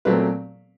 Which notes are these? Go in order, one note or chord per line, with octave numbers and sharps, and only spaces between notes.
A#2 F#3 A3 C4 B4